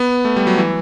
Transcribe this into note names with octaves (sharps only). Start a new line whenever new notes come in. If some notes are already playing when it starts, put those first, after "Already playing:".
Already playing: B3
A3
G3
F#3
E3